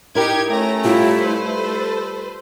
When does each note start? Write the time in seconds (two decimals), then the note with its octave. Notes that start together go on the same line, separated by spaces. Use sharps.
0.15 D#4 E4 G4 A#4 G#6
0.50 A3 C#4 A#5
0.85 G3 E4 F4 G4
1.19 B4 C5
1.56 A4